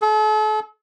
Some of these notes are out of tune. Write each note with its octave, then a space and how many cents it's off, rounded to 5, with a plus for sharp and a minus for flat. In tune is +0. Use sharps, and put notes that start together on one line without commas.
A4 -40